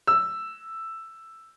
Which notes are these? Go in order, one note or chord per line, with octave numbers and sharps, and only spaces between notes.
E6